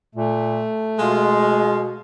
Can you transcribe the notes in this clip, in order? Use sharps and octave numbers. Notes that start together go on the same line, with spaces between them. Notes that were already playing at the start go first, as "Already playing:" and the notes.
A#2 A3
B2 G#3 F4